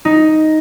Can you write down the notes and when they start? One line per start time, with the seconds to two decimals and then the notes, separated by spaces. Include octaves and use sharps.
0.05 D#4